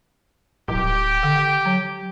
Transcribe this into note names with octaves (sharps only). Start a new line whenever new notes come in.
D1 G4
D3
F#3